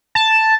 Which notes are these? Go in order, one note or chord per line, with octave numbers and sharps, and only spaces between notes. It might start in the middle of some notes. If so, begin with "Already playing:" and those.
A5